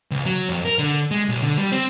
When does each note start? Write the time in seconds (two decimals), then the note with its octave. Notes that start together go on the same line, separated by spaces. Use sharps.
0.11 C#2
0.26 F#3
0.49 F2
0.65 A#4
0.79 D3
1.11 G#3
1.29 B1
1.42 D3
1.57 G3
1.72 C4